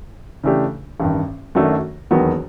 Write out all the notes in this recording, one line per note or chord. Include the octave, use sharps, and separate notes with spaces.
C#3 E3 A3 D4 G4
A1 G2 D#3
F#2 D#3 F#3 A3 D4
E1 D#2 D#3 F#3 B3